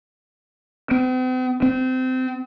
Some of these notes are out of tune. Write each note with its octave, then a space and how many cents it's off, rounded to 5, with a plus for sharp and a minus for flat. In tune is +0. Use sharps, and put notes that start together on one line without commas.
C4 -45
C4 -25